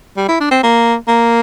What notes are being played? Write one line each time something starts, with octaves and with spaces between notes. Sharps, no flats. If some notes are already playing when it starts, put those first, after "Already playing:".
G3
E4
D4
C4
A#3
A#3